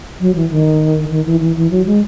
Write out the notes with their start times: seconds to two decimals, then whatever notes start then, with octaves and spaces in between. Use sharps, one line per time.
0.20 F#3
0.35 E3
0.50 D#3
1.11 D#3
1.26 E3
1.41 E3
1.56 E3
1.71 F#3
1.86 G#3